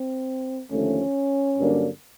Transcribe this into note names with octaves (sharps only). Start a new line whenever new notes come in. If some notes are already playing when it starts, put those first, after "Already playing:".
Already playing: C4
D#2 D3 F3 A3 C#4
G2 D3 F#3 A#3 D4